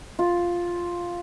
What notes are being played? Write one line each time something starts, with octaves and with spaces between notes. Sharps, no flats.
F4